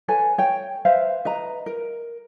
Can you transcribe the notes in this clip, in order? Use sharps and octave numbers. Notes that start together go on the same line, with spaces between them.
A4 B4 C#5 G#5
C#5 G5
B4 C5 E5 F5
B4 D#5 A#5
A#4